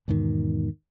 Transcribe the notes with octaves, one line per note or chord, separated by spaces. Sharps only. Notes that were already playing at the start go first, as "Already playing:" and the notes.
E2 G#2 B2 D#3